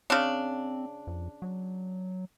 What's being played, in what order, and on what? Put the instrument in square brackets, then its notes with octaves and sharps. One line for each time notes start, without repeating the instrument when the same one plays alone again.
[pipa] C#3 D4 [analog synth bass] C4
[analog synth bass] F2
F#3